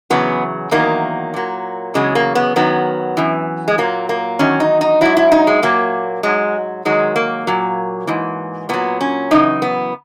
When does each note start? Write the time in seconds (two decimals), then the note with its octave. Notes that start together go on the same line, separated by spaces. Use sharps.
0.10 E2 C#3 F#3 B3
0.71 E2 D#3 F#3 A#3
1.34 A#2 F#3
1.94 E2 C#3 F#3 G#3
2.15 A#3
2.35 B3
2.56 F#2 D#3 F#3 B3
3.17 F#2 E3
3.68 G#3
3.78 A#2 F#3 A#3
4.09 A#3
4.39 E2 D#3 F#3 C#4
4.60 D#4
4.81 D#4
5.01 G#2 F#3 E4
5.17 E4
5.32 D#4
5.47 G#3
5.63 A#2 F#3 A#3
6.23 G#2 F#3 G#3
6.85 G#2 D#3 F#3 G#3
7.16 A#3
7.47 A#2 F#3
8.07 G#2 E3
8.69 A#2 F#3 B3
9.01 C#4
9.31 F#2 C#3 E3 D#4
9.62 B3